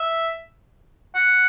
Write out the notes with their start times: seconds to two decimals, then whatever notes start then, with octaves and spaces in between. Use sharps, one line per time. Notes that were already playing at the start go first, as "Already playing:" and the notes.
Already playing: E5
1.15 F#5